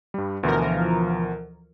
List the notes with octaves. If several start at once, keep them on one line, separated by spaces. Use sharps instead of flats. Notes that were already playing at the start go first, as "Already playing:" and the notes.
G2 G3
D2 B2 E3 F3 A#4